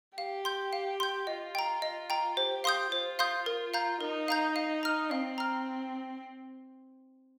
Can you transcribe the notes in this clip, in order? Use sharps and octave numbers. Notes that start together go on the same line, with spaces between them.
G4 F5
C6 G6
F5
C6 G6
F4 D#5
G5 A#5
D#5
G5 A#5
G4 C5
F5 C6 D#6 G6
F4 C5
F5 C6 D#6 G6
A#4
F5 A#5 G6
D#4 A#4
F5 A#5 G6
F5
A#5 F6
C4 F5
A#5 F6